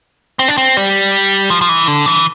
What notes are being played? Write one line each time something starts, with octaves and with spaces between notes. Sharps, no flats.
C4
D4
C4
G3
F3
F3
E3
D3
E3